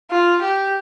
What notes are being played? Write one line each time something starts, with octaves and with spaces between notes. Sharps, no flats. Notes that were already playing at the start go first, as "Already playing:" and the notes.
F4
G4